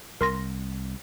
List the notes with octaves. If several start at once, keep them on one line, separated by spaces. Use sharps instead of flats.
C2 A#4 C6 A#6